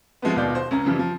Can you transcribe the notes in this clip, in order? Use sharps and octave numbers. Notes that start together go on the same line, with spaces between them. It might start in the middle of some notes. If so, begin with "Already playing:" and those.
F3 G#3 A3 B3
D#1 D#2 B2 F4 D5 G6
C5
C#2 C#4 A#5
F#2 C#3 E3 F3 G3
F3